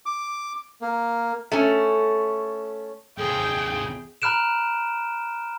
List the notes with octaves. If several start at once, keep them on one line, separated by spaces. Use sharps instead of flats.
D6
A#3
A3 C#4
D#2 C3 G#4 G5
A#5 B5 F6 F#6 D7 E7